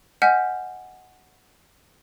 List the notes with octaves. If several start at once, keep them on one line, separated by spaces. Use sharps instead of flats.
D#5 F#5 G#5 F6 G6 B6